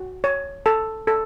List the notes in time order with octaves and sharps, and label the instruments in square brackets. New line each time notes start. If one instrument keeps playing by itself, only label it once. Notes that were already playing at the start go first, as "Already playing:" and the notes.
Already playing: [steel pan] F#4
C#5
A4 A5
A4